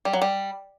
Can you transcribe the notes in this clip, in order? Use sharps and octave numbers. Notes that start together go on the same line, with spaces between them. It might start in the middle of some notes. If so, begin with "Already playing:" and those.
G3
F#3
G3